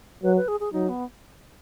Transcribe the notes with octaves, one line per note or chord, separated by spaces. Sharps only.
F#3 B4
B4
G#4
G#4
F#3 D#4
B3